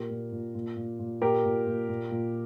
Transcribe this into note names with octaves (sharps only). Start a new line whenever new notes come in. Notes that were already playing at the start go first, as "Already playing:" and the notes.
Already playing: A#2 G4 A#4
A#2
A#2
A#2
A#2
A#2
A#2 G4 A#4
A#2
A#2
A#2
A#2